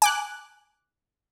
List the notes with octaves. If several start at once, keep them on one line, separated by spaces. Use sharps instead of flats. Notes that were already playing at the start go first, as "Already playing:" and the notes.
G#5 D6 F#6